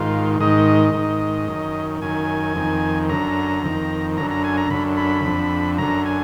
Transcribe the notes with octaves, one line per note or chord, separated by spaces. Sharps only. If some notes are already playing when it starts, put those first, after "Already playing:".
Already playing: G#2 D#3 F4
G#2 D#3 D#5
G#2 D#3
F#2 D#3
F#2 D#3 G#5
F2 D#3
F#2 D3 A#5
F2 D#3
F#2 D3 A#5
A#5
G#5
A#5
F#2 D3 B5
B5
F2 D3
F#2 D3 A#5
G#5